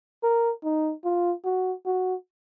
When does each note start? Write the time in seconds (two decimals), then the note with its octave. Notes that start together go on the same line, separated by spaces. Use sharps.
0.23 A#4
0.64 D#4
1.05 F4
1.45 F#4
1.86 F#4